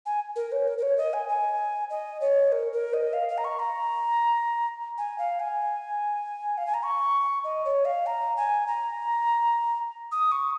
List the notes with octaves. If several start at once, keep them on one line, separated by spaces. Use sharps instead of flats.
G#5
A#4
C#5
A#4
A#4
C#5
D#5
G#5
G#5
D#5
C#5
A#4
A#4
D#5
F5
F5
A#5
C#6
A#5
G#5
F5
G#5
F5
G#5
A#5
C#6
D#5
C#5
F5
A#5
G#5
A#5
D#6
C#6